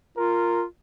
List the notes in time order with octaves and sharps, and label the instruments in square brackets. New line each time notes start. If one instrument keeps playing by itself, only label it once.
[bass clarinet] F4 [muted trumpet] A#4